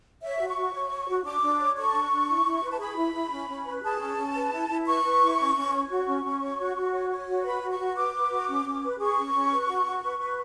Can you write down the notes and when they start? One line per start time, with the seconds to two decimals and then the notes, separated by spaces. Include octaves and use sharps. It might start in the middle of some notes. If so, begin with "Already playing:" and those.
0.22 C#5 E5
0.38 F#4
0.47 C#6
0.56 F#4
0.72 C#5
0.90 C#5
1.08 F#4
1.24 D4 D6
1.41 D4
1.59 C#5
1.77 A4 C#6
1.93 D4
2.11 D4
2.28 E4
2.45 E4
2.63 B4
2.71 A5
2.79 G#4 B5
2.96 E4
3.15 E4
3.32 C#4
3.48 C#4
3.65 B4
3.83 G#4 A5
4.00 C#4
4.17 C#4
4.35 B4
4.52 E4
4.69 E4
4.86 B4 C#6
5.04 B4
5.21 E4
5.38 C#4
5.56 C#4
5.72 C#5
5.89 F#4 C#6
6.07 C#4
6.24 C#4
6.41 C#5
6.59 F#4
6.76 F#4
6.92 C#5
7.10 C#5
7.28 F#4
7.44 B4 B5
7.62 F#4
7.70 C#6
7.79 F#4
7.96 B4 D6
8.13 B4
8.31 F#4
8.48 C#4
8.65 C#4
8.83 B4
8.99 G#4 C#6
9.17 C#4
9.34 C#4
9.51 B4
9.68 F#4
9.86 F#4
10.03 B4
10.20 B4